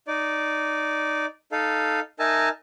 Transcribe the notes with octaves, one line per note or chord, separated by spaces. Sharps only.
D#4 D5
D#4 A4 F5
D#4 A#4 E5 G#5 A5